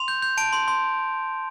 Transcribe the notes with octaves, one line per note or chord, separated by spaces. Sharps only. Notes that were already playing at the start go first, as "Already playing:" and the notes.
Already playing: C6 F7
G6
G6
A5 D7
C6
C6